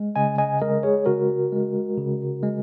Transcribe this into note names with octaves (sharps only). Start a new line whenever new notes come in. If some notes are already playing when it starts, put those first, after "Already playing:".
Already playing: G#3
C#3 D#5 G#5
D#5 G#5
G#3 A#4 D#5
G#4 C#5
C#3 F#4 A#4
G#3
C#3
G#3